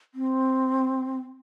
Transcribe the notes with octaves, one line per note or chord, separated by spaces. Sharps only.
C4